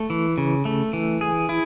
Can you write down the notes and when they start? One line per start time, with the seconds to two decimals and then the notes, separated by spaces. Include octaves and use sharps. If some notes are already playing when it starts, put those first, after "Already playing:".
Already playing: A3
0.10 E3
0.38 C#3
0.65 A3
0.93 E3
1.21 G#4
1.49 E4